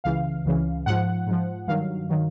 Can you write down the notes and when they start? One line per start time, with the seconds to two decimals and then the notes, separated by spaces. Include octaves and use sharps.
0.04 C#2 C#3 E3 F5
0.45 C#2 C#3 E3
0.86 G#2 F3 F#5
1.27 G#2 F3
1.68 G2 D#3 F#3 F5
2.09 D#3 F#3